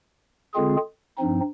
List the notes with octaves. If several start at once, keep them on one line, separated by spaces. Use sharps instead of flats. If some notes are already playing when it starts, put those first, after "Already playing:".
D3 G#3 C4 F4 G#4
G2 F3 C4 D#4